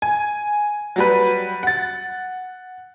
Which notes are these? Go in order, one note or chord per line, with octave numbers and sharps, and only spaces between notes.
G#5
F#3 G3 B4
F#5 A6